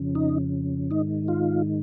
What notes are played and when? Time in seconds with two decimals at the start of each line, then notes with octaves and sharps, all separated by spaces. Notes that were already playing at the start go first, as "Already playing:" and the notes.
Already playing: F2 C#3
0.15 D#4
0.91 G#2 D#3 D#4
1.28 F4